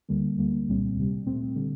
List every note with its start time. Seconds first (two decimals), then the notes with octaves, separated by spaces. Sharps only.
0.09 D2 D3 G3 A#3
0.38 D2 D3 G3 A#3
0.67 C2 A#2 G3 C4
0.97 D2 C3 G3
1.27 A#2 A3 C4
1.56 D3 G3